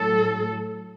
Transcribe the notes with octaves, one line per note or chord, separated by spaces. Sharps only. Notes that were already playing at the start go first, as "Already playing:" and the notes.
Already playing: A2 F#3 A4